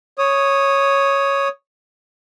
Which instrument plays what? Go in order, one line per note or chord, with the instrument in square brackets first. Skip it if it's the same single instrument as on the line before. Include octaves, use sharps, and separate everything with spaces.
[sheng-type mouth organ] C#5 D#6